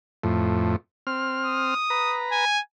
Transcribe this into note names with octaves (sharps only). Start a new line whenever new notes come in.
F2 A2
C4 F6
D#6
B4 A#5
G#5